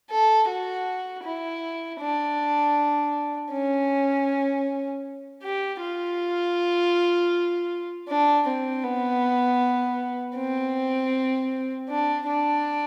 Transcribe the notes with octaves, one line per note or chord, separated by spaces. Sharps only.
A4
F#4
E4
D4
C#4
G4
F4
D4
C4
B3
C4
D4
D4